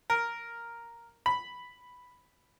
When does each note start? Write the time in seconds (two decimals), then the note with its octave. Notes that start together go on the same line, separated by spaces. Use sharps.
0.10 A#4
1.26 B5